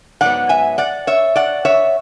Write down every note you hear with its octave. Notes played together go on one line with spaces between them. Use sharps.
G#2 F#3 B3 D5 F#5
E5 G#5
D5 F#5
C#5 E5
D5 F#5
C#5 E5